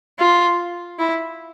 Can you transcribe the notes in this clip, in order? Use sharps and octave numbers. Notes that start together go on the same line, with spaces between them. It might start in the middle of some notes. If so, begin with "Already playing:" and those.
F4
E4